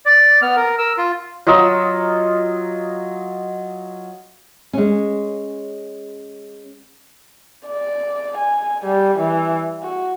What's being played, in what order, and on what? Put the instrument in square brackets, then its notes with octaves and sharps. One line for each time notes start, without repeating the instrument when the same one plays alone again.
[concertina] D5
B3 F6
A#4
A#4 E6
F4
[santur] F#3 F4 D#5 E6
[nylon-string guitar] G#3 C#4
[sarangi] D5
G#5
G3
E3
F#4